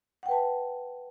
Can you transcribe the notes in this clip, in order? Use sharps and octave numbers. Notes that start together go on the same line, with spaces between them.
B4 F#5 G5 A5